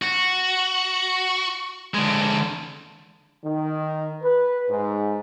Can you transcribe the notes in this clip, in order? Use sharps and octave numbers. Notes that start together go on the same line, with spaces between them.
F#4
D3 G#3
D#3
B4
G#2